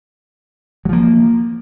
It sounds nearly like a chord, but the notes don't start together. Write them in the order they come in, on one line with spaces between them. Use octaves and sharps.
F#3 F3 A#3